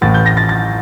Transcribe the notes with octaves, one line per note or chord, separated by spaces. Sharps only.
A1 A2 E3 A6
G6
A#6
A6
A6